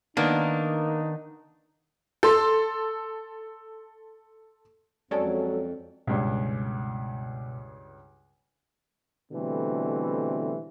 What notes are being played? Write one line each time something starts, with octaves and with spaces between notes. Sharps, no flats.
D#3 A#3 B3 D4 D#4
A4 C6
F2 F#3 G#3 C#4 A4 D5 G#5 A5
C#2 G2 B2
B2 D3 E3 G3 A3 C4